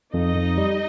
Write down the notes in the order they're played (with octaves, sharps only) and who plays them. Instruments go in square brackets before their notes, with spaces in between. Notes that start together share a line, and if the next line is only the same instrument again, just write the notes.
[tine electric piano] F2 [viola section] D#4 D#5
[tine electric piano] F2
G3